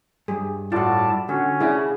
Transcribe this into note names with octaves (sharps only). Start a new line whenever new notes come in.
G2 G#4
A2 F4 F#4 D5 A5
D3 C#4 F#4
D4 E4 G#4 F5